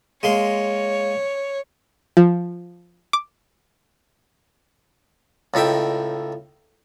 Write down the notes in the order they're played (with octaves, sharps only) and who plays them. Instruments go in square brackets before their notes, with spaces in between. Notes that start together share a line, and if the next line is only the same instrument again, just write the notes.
[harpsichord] G#3 A#3 C6 [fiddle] C#5
[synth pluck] F3
D6
[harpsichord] C#2 A2 D#4 E5 G5